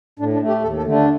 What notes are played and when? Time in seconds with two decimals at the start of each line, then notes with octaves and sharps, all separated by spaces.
0.19 A2 D4
0.33 D4
0.41 A3
0.48 G4
0.63 D#2 A4
0.77 A4
0.84 D3 A3
0.92 D4